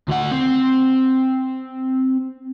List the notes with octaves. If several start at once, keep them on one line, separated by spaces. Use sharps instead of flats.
D2 F#5
C4